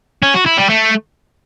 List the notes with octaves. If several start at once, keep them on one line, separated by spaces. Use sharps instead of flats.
C#4
F#4
E4
G3
A3